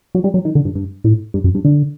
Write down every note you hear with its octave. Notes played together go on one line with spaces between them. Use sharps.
F#3
G3
F#3
D#3
D3
G2
G2
A2
G2
F#2
G2
D3